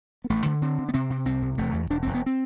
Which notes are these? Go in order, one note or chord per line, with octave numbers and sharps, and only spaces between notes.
B3
A1 A3
D3
D3 C4
D3
B3
C3 C4
C3
C2 C4
C3
E1 A3
E2
E1 D4
E1 C4
B3
C4